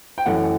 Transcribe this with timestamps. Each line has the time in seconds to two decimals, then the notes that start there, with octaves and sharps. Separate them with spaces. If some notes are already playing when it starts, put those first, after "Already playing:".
0.18 G5
0.26 F#2 E3 A3 F#5